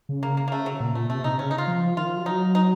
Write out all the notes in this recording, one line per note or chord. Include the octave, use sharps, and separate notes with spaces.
C#3
A#3
A#3
A#3
A3
F#3
A#2
A3
C3 A3
C3 D#4
C#3 C#4
D#4
F4
F3
D#3 F4
F3
F#3
D#4
D#4